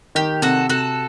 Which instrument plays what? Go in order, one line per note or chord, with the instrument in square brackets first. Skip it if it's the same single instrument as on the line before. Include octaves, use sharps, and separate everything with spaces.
[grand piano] D#3 [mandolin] G4
[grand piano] C3 [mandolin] F#4 A4
[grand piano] C3 [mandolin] F#4 A4